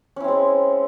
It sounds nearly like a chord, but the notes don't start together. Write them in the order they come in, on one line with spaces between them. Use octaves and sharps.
C#4 E4 C4 G#3